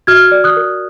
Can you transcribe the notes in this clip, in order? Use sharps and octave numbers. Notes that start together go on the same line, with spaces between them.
F#4 F6 G#6
D5
D#6 F#6
A#4